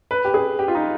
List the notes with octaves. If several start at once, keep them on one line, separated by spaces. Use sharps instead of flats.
B4
G4
G#4
G4
F4
D#4